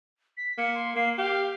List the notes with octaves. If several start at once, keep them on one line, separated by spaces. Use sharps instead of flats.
B6
A#3 C#7
C6
A#3 C7
G4 F5